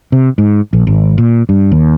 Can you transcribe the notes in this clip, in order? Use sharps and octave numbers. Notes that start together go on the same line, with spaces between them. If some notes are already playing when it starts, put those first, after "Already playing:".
C3
G#2
A#1
G#1
A#2
G2
D#2